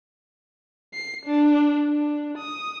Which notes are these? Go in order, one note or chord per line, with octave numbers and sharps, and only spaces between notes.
C7
D4
D4
D#6